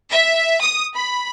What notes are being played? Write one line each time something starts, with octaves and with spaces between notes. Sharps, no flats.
E5
D#6
B5